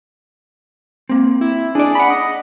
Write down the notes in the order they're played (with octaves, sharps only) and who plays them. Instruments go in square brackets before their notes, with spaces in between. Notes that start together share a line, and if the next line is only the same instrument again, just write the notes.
[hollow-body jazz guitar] A#3 C4
[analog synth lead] E4
[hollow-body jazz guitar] D4 D5 [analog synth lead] G#4
[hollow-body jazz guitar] F#5 B5
[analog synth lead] D#5